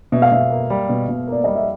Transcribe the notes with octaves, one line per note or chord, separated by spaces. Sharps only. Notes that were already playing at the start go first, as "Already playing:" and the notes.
B2 E5
F5
B2 E5
A#3
G3
B2
B2
A#3 D5
G3 D#5
E5